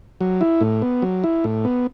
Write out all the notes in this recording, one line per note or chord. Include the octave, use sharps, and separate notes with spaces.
F#3
E4
A2
B3
F#3
E4
A2
B3